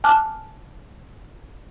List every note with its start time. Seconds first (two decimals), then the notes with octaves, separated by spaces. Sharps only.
0.04 G#5 A5 D6 F6 F#6